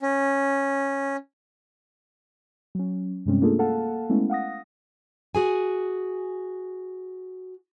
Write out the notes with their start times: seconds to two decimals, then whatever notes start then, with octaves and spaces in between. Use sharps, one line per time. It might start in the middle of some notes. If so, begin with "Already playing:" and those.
0.02 C#4
2.75 F#3 C#4
3.26 G2 C3 G3 G#3 C4 C#4
3.41 A3 A#3 D4 F4 G#4 A4
3.59 A#3 A4 F5 F#5 A5
4.10 G#3 A3 B3 C#4 E4
4.30 F5 F#5 D#6 A#6
5.35 F#4 G#4 G#5